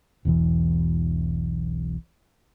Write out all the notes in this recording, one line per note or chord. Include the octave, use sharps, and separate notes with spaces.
E1 B1 E2 E3